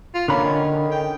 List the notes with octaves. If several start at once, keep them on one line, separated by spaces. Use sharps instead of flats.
F4
D3 A#3 C#4 B5
D#3
G5